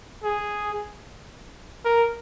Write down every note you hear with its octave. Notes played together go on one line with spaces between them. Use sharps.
G#4
A#4